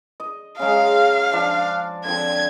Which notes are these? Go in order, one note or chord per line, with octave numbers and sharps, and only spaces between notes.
D#5
C#3 F#3 G#3 F5
F3 D4 C5
D3 F3 C4 G#6